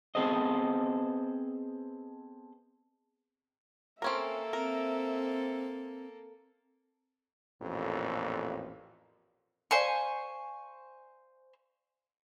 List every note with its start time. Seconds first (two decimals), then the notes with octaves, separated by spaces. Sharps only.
0.15 B3 C4 G#4 A4 C5 D#5
4.02 A#3 C4 C#4 A4 A#4 E5
4.53 C4 A#4
7.61 A1 F2 A#2
9.71 C5 D5 F5 G#5 A5 C#6